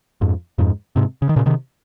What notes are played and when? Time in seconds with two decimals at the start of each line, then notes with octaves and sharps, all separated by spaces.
0.21 F2 G#2
0.58 F2 G#2
0.96 G#2 C3
1.22 C#3
1.29 D#3
1.36 A#2 C#3
1.46 C3 D#3